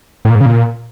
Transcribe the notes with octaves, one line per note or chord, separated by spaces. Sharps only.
A2
A#2
G#2
C#3
A#2